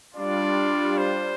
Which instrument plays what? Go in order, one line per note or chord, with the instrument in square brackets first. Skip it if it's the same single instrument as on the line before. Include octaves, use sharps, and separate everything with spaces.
[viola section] G3 D4 F4 [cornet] D5
[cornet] C5